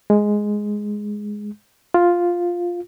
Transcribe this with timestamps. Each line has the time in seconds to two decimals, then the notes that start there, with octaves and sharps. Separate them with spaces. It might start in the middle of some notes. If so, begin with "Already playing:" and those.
0.10 G#3
1.94 F4